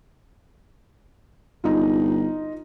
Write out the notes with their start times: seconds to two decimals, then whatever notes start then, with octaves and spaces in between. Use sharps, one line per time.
1.64 G1 D#4 F4